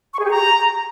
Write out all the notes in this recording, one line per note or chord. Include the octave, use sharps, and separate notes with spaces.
C#6
G#4
G4
A#5